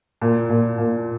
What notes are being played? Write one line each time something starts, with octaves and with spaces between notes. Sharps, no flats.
A#2
A#2
A#2